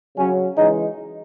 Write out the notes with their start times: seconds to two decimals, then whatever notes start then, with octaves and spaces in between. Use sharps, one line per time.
0.16 C#3 F#3 C#4
0.57 C#3 E3 G#3 D#4